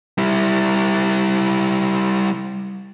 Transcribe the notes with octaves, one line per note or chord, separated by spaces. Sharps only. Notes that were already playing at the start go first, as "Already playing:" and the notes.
G3 E4